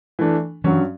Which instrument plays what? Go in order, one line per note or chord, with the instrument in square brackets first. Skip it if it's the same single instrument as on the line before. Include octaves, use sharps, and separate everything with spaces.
[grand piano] E3 A3 D4
[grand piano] G2 F#3 C#4 [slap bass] E3 G3